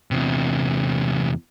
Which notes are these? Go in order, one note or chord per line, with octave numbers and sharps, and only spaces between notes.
E2 C3